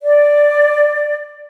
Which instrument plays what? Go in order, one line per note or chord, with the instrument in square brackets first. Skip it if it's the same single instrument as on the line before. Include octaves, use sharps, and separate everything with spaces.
[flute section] D5